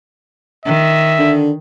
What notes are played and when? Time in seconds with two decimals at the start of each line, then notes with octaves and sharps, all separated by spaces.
0.65 D#3 E5
1.19 D3